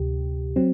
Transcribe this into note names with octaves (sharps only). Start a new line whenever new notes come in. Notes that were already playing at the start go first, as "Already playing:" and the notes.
Already playing: D2 C3 G4
F#3 C4